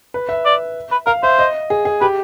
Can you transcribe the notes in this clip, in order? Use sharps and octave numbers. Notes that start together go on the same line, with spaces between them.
B4
E5
D5
B4
A#4 F5
C5 E5
D#5
G#4
G#4
G4 B4